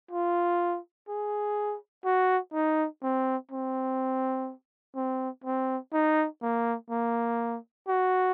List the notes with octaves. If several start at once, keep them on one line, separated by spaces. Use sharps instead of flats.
F4
G#4
F#4
D#4
C4
C4
C4
C4
D#4
A#3
A#3
F#4